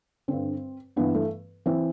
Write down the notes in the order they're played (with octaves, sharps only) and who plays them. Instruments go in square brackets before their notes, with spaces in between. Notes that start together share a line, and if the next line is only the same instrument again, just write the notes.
[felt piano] G2 D3 C4
G2 E3 B3
A3
E3 C4